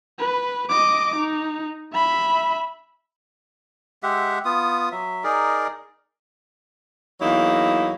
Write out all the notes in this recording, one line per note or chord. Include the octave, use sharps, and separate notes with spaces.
B4
D#5 D6
D#4
E5 B5
G#3 G4 E5 F#5
B3 F4 D#6
F#3 E5
D#4 G#4 A#4 D5
E2 F#3 A#3 D#4 E4